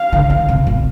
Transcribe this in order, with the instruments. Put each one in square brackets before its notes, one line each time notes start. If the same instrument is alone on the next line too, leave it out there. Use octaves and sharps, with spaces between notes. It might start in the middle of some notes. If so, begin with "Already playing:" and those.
Already playing: [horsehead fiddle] F5
[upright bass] D3
E3
C3
B2